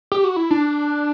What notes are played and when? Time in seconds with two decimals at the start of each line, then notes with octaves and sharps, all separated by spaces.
0.12 G4
0.24 F#4
0.36 E4
0.51 D4